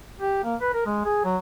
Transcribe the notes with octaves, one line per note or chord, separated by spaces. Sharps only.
G4
A#3
B4
A#4
G#3
G#4
F#3